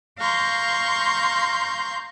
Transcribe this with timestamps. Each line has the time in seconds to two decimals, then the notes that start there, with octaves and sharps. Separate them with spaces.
0.18 F5 A#5 C6 C#6 G6